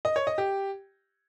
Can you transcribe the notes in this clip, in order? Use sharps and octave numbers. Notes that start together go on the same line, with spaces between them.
D#5
C#5
D#5
G4